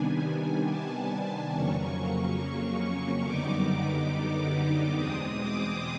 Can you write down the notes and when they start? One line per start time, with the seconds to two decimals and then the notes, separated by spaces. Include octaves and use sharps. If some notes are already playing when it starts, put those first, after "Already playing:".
Already playing: C3 D#3 G3 B3 D4 G#5
0.68 A5
1.53 F2 C#3 F#3 A#3 C#4 C#6
2.39 C#6
3.25 F#2 D3 G3 B3 D#4 D6
4.97 E2 B2 G#3 C4 D#6
5.40 D6